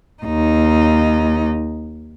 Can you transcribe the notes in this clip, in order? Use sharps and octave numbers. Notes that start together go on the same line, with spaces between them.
D#2 D#4